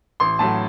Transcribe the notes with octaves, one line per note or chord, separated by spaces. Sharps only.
A1 C6
A2 F#3 A5